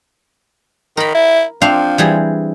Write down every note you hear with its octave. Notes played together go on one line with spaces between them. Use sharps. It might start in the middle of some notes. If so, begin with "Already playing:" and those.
D#3 A#4 B5
E4
F3 C4 D4 F5
E3 G3 G#4